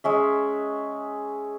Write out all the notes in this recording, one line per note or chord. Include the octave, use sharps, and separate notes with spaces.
G#3 C#4 E5